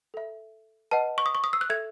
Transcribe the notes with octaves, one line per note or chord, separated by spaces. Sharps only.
A4 E5
B4 D#5 F#5 A5
C#6
D#6
C#6
D#6
E6
F#6
A4 E5 G#6